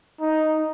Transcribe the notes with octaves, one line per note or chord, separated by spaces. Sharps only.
D#4